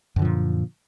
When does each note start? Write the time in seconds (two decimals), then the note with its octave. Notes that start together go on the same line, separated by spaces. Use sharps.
0.16 F#2
0.19 D3
0.22 F3
0.25 A#2